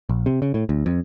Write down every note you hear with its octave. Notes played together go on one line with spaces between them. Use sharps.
A#1
C3
C#3
A2
D2
F2